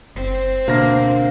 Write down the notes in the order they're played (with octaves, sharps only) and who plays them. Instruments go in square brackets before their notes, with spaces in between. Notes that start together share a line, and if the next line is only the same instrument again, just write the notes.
[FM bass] F#1 [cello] C4
[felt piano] D2 F6 A#6 [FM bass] B2 [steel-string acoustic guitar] A#3